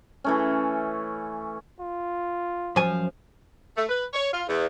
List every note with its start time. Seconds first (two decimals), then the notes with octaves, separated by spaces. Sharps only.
0.24 E3 A3 C#4
1.80 F4
2.76 F#2 F3 G#5
3.76 A3
3.88 B4
4.13 C#5
4.32 F4
4.48 E2